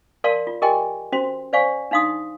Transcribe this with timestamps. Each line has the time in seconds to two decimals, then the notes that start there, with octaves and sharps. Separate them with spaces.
0.24 A#4 D5 F5 A5 C6
0.47 F4
0.62 G4 A#4 D#5 G5 G#5 C6
1.12 C#4 F#4 C5 C6
1.53 C5 D5 F5 G#5 C#6
1.91 D4 D#4 F5 C6 D#6